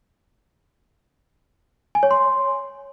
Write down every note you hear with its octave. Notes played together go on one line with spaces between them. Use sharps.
G#5
C#5
C6